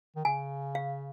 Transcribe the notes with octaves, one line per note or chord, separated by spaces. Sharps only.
D#3
C#3 G#5
F5